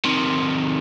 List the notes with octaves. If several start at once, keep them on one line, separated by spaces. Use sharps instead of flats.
C3 D#3